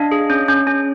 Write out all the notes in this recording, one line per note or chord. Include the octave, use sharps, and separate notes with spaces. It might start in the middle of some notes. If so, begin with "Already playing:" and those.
Already playing: D4 D#5 F5
G#4
C#4
C#4
C#4